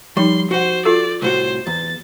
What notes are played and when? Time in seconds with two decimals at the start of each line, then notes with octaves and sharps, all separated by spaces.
0.17 F3 G3 D#4 C6
0.51 F#4 C5 F#5
0.85 F4 A4 D5
1.22 C2 A2 F#4 C5
1.67 E2 A6